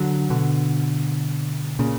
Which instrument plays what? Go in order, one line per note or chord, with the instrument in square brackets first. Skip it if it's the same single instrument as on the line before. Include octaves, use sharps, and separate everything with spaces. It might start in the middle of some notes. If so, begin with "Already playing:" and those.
Already playing: [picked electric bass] D3 F#3
B2 D3
A#2 C#3